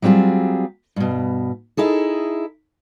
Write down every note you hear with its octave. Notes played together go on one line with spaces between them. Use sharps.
F#3 G3 C4 F4 G#4
G2 B2
D#4 E4 G#4 A4